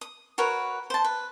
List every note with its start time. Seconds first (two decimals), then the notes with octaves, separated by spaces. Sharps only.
0.01 D#6
0.38 F#4 A#4 B4 C#5
0.90 C5 A5
1.04 B4